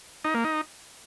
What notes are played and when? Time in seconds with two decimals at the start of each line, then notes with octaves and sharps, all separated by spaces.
0.25 D#4
0.34 A#3
0.44 D#4